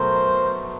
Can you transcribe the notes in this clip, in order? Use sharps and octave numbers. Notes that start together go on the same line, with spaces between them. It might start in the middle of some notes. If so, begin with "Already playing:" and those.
Already playing: B2 F#3 A3 A#4 C5